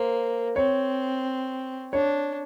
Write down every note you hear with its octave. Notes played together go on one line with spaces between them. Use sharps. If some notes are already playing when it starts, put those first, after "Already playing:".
Already playing: A#3 C5
C4 C#5
D4 C#5